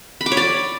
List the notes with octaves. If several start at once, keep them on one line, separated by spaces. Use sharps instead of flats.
B5
D6
C#5
D5